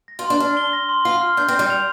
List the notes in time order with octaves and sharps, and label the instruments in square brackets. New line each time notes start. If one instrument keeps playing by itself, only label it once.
[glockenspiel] A#6
[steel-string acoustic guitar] F4
[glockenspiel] C6
[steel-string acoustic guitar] D4
[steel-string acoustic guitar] D4 [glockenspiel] F6
[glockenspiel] G7
A#6
C6
[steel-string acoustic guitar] F4 [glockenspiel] C7
[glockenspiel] F6
[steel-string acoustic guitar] D4 [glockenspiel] G6
[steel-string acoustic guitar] C4
[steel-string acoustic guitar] G3 [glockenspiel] G6
[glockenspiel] F7